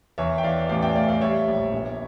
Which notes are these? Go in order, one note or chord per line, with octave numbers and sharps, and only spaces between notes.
E2 C#5 E5
G5
E3 D5 F5
A1 D5 F5
E5 G5
A2 D5 F5
D5 F5
G3 C#5 E5
A#1
G1